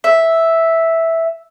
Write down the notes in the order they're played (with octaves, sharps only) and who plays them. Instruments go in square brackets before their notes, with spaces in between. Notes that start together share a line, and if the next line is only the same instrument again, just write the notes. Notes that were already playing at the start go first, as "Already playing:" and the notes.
[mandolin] E5